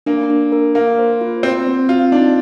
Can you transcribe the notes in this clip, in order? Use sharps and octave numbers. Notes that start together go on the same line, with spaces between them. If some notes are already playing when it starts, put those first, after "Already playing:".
A#3 D4
D4
A#4
A#3 F5
C5
F4
C4 C5
C4
C4 F4
D4 D#4